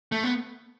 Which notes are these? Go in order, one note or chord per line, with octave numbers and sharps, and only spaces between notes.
A3
B3